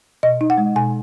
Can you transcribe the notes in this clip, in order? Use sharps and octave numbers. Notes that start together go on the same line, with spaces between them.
B2 D#5
D#4
F#5
G#3
B2 G#5